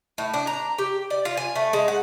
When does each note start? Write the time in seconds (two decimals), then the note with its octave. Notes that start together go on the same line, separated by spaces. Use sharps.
0.18 A2
0.34 D4
0.47 A#5
0.78 G4
1.10 D5
1.25 F4
1.37 G#5
1.56 A3
1.73 G#3
1.88 F#5